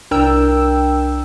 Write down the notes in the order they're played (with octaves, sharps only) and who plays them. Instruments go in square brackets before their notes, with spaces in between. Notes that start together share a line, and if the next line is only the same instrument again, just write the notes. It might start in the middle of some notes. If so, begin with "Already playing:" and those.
[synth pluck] C2 D4 A#4 G5 E6